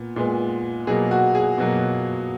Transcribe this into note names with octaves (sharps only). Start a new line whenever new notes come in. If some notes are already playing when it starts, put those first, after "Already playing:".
Already playing: A#2 B3
A#2 G#3 B3
B2 F#3 A#3 G#4
F#4
G#4
B2 F#3 A#3